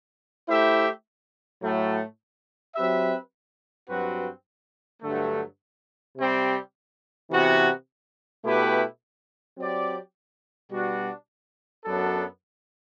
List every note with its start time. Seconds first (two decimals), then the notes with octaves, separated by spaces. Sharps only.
0.48 A3 E4 G4 C5 E5
1.62 A2 F#3 A3
2.75 F#3 C4 G4 B4 E5
3.89 G2 F#3 C4 F#4 B4
5.02 G2 D3 F#3 A3
6.17 C3 G3 C4
7.31 C3 E3 B3 F#4
8.44 B2 A3 E4 G4 B4
9.57 F#3 C4 G4 D5
10.71 B2 G3 D4 F#4
11.84 F#2 F#3 B3 D4 A4